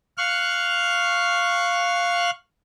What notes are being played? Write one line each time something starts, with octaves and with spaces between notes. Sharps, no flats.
F5 C#6 F6 F#6